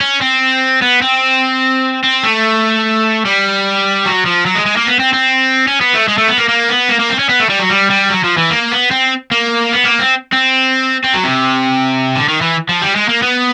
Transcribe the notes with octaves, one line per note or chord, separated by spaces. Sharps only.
C#4
C4
B3
C4
C4
A3
G3
F#3
F3
F#3
G#3
G#3
A#3
B3
C4
C4
C#4
B3
A3
G#3
A3
B3
A#3
A#3
B3
A#3
A#3
C4
C#4
B3
A3
G3
F#3
G3
G3
F#3
F3
E3
A#3
B3
C4
A#3
B3
A#3
C4
C4
C4
F#3
C3
D3
D#3
E3
F3
G3
G#3
A#3
B3